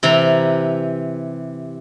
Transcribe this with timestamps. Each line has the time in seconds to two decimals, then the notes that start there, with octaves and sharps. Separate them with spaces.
0.03 C3 E3 A#5